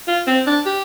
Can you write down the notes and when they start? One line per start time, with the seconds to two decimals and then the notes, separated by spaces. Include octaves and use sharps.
0.07 F4
0.27 C4
0.47 D4
0.66 G4